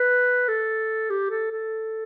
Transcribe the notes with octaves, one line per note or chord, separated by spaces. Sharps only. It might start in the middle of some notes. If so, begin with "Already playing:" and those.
Already playing: B4
A4
G4
A4
A4